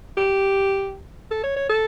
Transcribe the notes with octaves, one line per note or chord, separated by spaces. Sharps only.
G4
A4
C#5
C#5
A4